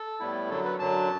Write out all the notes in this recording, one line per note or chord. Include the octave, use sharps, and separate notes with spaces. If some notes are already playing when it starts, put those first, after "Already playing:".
Already playing: A4
A2 G3 B3 E4
F#2 D3 F#3 A4
B4
F#2 D3 F#3 A5